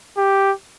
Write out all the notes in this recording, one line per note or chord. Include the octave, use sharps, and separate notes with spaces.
G4